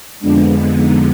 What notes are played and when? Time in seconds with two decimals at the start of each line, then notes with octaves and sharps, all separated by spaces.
0.20 F2 D3 F3 G#3 B3 D4
0.75 D#4